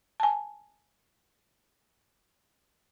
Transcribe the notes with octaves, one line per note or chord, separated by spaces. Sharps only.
G#5 A5